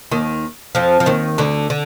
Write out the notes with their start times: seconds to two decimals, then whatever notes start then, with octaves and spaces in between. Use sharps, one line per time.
0.11 D#2 D#3
0.75 F2 F3
1.00 F3
1.06 D#2 D#3
1.38 D2 D3
1.70 D3